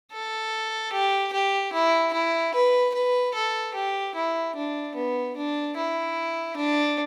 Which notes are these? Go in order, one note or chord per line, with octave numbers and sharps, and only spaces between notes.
A4
G4
G4
E4
E4
B4
B4
A4
G4
E4
D4
B3
D4
E4
D4